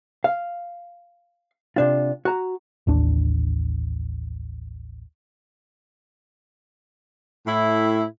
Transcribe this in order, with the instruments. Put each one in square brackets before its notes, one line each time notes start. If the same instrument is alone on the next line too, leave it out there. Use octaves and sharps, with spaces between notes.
[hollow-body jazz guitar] F5
C3 D4 F4
F#4 A#5
[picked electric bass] A1 D#2 D4
[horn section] A2 E4